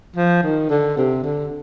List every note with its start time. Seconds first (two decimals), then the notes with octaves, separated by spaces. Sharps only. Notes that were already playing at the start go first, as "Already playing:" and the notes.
0.16 F3
0.43 D#3
0.70 D3
0.97 C3
1.24 D3